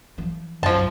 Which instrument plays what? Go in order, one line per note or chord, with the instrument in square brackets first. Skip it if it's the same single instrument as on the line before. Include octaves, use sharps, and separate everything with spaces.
[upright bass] E3 F3
[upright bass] B1 [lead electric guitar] F#2 [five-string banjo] F3 A5